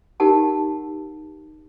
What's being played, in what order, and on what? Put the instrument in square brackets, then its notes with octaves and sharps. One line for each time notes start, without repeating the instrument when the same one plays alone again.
[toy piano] D#4 G4 A#4 F#5 A5